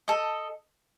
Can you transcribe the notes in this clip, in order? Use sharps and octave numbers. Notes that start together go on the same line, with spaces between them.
A4 D#5